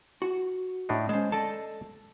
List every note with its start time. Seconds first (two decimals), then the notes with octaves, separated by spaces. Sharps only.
0.22 F#4
0.89 A2 D4 D#4
1.09 G#3 C#4 C5 A5
1.32 A4 D5 D#5 A5